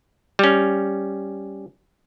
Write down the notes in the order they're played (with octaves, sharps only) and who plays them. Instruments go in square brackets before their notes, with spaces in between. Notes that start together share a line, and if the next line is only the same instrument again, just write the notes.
[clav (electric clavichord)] G3 C#4